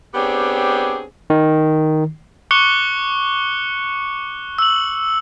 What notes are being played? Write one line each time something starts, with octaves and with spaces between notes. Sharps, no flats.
B3 C4 D4 G4 G#4 C#5
D#3
C#6 D6 F#6 C#7 G7
E6 F#7